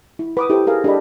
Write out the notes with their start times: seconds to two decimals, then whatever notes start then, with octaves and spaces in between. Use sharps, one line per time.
0.19 E4
0.37 B4 D6 D#6
0.50 E4 G4 A4 B4 C5
0.67 G#4 A#4 F5
0.84 D4 G4 A4 D#5 B5